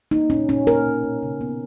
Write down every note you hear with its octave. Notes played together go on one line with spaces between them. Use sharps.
A#3 D#4
A#2 C#4
A#2 C#4
A#3 A#4
B2
B2
C#3
B3